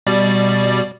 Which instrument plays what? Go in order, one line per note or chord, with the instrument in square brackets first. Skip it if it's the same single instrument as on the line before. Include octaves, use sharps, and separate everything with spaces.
[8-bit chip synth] B2 G3 D5